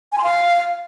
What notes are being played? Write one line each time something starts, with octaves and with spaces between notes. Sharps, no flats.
G#5
C6
F5